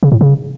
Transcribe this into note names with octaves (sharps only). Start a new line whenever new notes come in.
C#3
A2
C#3